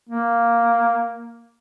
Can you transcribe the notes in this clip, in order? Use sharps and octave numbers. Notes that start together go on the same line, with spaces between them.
A#3